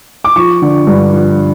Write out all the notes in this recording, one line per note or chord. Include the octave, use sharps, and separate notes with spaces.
D6
F3 C#6
D3
G2
F3